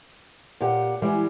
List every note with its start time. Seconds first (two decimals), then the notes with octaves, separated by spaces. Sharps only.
0.61 A#2 G4 F#5
1.02 E3 G3 G#3